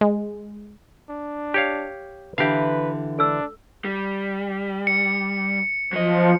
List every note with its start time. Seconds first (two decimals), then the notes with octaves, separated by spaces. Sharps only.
0.01 G#3
1.09 D4
1.54 G4 C#5 F5
2.38 D3 E3 G4 B4 F5
3.19 D4 A4 E6
3.85 G3
4.87 C#7
5.93 F3 F#3 D#5